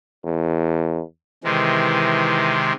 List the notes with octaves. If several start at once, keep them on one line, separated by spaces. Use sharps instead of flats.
E2
C3 D#3 E3 G#3